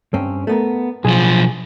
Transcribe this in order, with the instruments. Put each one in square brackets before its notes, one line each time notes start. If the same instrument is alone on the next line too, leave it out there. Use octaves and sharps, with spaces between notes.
[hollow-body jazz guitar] G2 C4 C#4
A3 B3 A#4
[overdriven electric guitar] B1 F3 [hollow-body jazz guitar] G#4